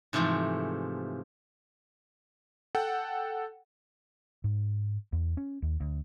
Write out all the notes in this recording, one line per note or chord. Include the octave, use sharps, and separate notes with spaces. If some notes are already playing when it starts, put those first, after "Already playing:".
G#2 C3 E3 F3 A3
A4 F#5 G5
G#2
E2
C#4
D#2
D2